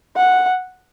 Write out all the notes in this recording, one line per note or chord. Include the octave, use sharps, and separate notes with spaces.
F#5